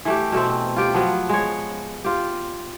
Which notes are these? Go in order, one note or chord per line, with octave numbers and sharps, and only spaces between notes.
E3 A3 G4
B2 A3 C4
F4 G4 G5
F3 F#3 B3
G#3 C#5
F4 G4